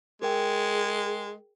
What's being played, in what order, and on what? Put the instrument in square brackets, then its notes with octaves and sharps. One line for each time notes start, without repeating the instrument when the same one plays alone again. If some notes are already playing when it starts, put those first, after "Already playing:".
[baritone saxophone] G#3 [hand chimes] G#4 A#4 G5